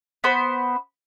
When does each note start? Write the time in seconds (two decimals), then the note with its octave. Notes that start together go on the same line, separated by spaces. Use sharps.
0.24 B3 C5 B5